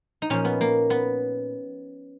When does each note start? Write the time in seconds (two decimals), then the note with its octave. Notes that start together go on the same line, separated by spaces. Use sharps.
0.22 D#4
0.30 A#2 F3 C#4
0.45 B3
0.61 A#3
0.90 B3